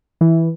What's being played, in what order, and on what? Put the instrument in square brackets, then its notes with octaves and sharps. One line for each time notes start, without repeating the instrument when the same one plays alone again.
[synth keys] E3